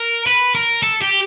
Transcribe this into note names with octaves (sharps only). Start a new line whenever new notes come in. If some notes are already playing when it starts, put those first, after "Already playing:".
Already playing: A#4
B4
A#4
A4
G4